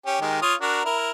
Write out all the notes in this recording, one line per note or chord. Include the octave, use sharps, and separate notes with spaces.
C#4 G4
D#3 G#3 G4
F4 C#5 D#6
D4 F#4 A#4
E4 A#4